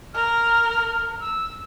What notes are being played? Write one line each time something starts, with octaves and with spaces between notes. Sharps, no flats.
A#4 F6
E6